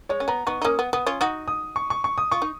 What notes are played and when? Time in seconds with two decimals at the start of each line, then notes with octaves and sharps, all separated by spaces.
0.09 G#3 C#5
0.20 C#4
0.28 B3 A#5
0.47 B3 D#4 C#6
0.62 D#4
0.64 A#3 C#4 D#6
0.79 B3
0.93 B3 D#6
1.06 C#4 F4
1.20 D#4 F#4 D#6
1.48 D#6
1.76 C#6
1.90 C#6
2.04 C#6
2.18 D#6
2.31 F4 C#6
2.42 D#4